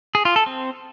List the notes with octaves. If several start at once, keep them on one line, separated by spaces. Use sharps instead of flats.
G#4
F4
A4
C4